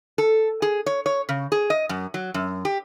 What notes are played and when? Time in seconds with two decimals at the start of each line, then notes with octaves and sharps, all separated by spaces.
0.18 A4
0.62 G#4
0.86 C#5
1.06 C#5
1.29 C#3
1.52 G#4
1.70 D#5
1.89 F#2
2.14 F#3
2.34 F#2
2.65 G4